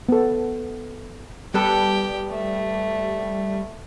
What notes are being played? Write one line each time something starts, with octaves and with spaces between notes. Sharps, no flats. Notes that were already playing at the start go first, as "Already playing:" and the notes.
B3 A4
G3 B3 G4 A4 B4 G5
A3